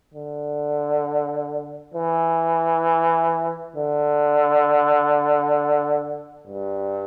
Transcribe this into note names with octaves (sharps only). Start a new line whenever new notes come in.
D3
E3
D3
G2